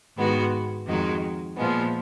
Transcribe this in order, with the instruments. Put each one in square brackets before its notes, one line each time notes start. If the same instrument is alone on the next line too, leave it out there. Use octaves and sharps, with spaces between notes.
[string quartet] G#2 D#3 G#3 B3 F#4
F2 D#3 G#3 D#4 F#4
A#2 F3 G#3 B3